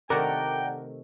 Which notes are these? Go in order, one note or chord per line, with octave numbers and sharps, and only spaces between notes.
C3 D#3 A3 A#4 D5 F#5 G5 A#5